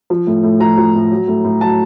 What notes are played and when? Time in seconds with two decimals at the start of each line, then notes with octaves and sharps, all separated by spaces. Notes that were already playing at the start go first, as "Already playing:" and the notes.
0.10 F3
0.27 A2
0.43 A2
0.60 F3 A#5
0.77 F3
0.94 A2
1.11 F#3
1.28 A2
1.44 A2
1.61 F#3 A5